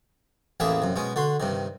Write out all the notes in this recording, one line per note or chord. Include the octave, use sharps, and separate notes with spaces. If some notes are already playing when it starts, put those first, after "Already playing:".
A1 E2 A2 A#3 G#4 E5
F#2 C3
B2 G#3 C#4
D3 F#4 C6
G2 C3 D#3